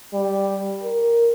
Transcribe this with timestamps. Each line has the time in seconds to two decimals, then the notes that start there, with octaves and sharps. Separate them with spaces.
0.14 G3
0.83 A#4